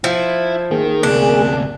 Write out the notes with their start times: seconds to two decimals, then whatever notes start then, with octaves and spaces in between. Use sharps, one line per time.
0.04 F3 E4
0.71 D#3 A#3 G#4
1.03 D2 C3 D4